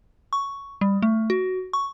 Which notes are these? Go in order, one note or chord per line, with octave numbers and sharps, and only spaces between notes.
C#6
G3
A3
F#4
C#6